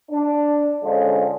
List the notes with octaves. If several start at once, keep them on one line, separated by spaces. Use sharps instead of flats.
D4
D3 F3 G#3 C#4 D4 A4